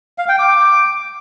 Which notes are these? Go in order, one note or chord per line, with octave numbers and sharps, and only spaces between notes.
F5
G5
D6